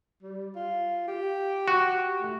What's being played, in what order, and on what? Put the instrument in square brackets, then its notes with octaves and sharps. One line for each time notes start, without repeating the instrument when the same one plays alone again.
[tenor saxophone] G3
F4
G4
[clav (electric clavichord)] F#4
[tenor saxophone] A3